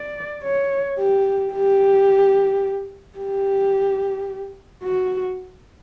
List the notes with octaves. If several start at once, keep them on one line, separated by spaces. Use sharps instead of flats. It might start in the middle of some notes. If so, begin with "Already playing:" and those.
Already playing: D5
C#5
G4
G4
G4
F#4